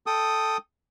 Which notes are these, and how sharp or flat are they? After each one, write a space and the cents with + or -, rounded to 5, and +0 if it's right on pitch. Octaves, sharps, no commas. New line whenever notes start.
A4 +0 G5 +0 D#6 +0